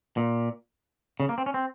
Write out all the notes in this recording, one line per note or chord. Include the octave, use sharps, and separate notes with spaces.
A#2
C#3
A#3
C4
C#4
C4